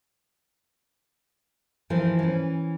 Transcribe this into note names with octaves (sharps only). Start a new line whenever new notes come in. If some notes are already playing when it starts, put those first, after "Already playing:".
E3 F3 E4 A#4
E3 C#4